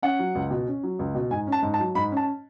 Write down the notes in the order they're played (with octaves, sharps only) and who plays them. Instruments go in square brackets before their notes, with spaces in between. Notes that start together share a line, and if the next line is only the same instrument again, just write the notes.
[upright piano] C#4 F#5
F#3
C#2
B2
C#4
F#3
C#2
B2
G#2 G#5
C#4
A5
G#2
A5
F#3
G#2 B5
C#4
A5